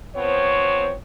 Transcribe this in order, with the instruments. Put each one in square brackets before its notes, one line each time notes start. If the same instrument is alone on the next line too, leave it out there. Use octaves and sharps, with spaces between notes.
[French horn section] F3 B3 C4 C5 C#5